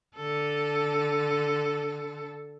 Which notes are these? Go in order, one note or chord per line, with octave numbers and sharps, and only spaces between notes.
D3 A4